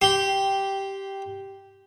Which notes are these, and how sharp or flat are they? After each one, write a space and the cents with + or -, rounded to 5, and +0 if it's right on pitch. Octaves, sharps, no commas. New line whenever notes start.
G4 -5 C6 +0